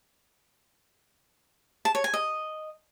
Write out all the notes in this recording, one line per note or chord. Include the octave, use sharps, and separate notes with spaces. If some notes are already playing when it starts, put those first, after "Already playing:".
A5
C#5
G#5
D#5